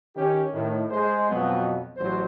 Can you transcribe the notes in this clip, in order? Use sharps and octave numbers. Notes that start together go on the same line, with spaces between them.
D#3 C#4 G4
A2 D#3
G#3 C5
F2 B2 F#3 B3
A1 F#3 C5